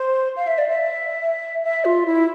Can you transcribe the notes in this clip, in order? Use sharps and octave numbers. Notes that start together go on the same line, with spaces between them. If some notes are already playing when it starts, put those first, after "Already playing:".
Already playing: C5
F5
E5
D5
E5
E5
F4
E4